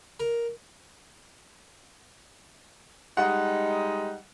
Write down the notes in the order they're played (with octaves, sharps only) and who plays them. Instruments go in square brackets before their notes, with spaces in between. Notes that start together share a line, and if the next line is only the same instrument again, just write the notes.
[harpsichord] A#4
[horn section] G3 G#3 D#4 [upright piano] F#5